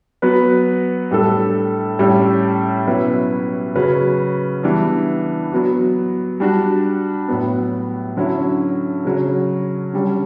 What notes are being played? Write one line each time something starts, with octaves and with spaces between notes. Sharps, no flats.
F#3 B3 F#4 B4
A2 G3 D4 A4
A2 G3 C#4
B2 F#3 C#4 E4 B4
C#3 F#3 C#4 F#4 B4
E3 G3 B3 D4
F#3 B3 F#4
G3 D4 F#4
A2 F#3 B3
D3 F#3 C#4 E4
C#3 F#3 C#4
D3 G3 C#4